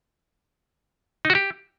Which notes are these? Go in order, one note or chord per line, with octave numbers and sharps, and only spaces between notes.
D#4
F#4
G4